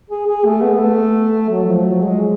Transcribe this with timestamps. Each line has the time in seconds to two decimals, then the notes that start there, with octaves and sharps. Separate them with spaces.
0.10 G#4
0.27 G#4
0.44 A3
0.61 B3
0.79 A3
1.49 F#3
1.66 F3
1.84 F#3
2.02 G#3